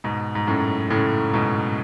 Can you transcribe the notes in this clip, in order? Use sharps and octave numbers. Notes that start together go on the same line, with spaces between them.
G#2 B2
G#2
F#2 A2
A2 C#3
G#2 B2